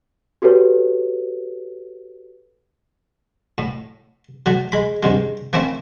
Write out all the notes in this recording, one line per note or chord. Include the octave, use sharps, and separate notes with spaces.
F#4 G4 A4 B4 C#5
A2
F#3 A3
G#3 B5
G2 C3 G#3
A3 A#3 C4 C#4 E4